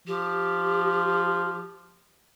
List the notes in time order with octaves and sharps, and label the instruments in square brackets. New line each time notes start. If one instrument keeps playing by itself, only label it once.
[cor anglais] F3 [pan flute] G4